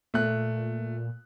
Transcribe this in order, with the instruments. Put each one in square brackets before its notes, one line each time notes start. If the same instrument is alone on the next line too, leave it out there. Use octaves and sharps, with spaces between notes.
[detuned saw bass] A#2 [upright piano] A3 F#6